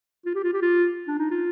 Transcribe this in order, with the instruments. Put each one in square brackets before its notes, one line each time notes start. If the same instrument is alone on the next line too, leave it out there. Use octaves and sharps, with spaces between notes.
[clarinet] F4
G4
F4
G4
F4
D4
D#4
F4